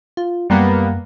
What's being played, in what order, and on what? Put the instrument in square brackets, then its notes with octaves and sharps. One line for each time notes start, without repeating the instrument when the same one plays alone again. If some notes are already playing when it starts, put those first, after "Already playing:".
[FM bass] F4
[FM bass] F#2 [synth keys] G3 A#3 B3